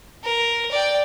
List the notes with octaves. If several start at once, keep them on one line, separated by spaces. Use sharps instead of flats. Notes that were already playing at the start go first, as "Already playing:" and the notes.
A#4
D5 G5